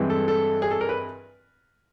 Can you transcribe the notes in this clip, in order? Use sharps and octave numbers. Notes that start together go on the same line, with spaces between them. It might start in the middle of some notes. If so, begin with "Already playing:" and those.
Already playing: G2 E3 G#3 C4
A4
A4
G#4
A4
A#4
B4